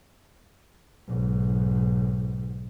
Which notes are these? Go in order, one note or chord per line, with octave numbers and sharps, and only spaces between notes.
B1 G#2